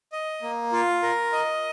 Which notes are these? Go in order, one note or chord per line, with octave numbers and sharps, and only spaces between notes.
D#5
A#3
F4
A#4
D#5